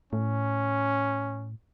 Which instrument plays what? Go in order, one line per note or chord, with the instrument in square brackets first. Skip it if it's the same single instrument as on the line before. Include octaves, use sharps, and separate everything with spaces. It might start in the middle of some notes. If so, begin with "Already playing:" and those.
[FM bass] A2 [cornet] C#4